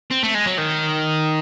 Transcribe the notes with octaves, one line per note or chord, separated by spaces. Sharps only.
C4
A3
G#3
F#3
D#3